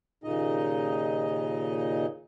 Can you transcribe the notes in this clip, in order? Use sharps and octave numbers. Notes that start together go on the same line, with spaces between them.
D#2 A#2 C#3 D#4 D#5